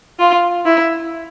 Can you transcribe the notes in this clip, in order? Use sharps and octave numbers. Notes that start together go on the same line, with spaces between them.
F4
E4